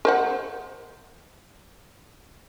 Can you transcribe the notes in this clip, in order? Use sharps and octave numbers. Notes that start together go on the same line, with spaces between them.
A#4 C5 F#5